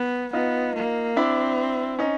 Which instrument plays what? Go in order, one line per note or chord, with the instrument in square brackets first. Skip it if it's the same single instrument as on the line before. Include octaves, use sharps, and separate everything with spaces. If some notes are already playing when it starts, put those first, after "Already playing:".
Already playing: [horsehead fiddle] B3
[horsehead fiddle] B3 [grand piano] D#4 F4
[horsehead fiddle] A#3
[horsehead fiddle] C4 [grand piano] D4 E4
[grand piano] C#4 D#4